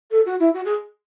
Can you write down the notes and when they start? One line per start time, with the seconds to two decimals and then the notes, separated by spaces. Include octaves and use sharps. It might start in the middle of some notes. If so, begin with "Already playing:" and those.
0.11 A4
0.26 F#4
0.40 E4
0.54 F#4
0.65 G#4